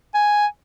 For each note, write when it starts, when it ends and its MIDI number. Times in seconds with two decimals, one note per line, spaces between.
0.14 0.46 80